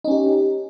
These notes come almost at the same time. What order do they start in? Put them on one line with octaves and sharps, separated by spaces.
D#4 C#4 G4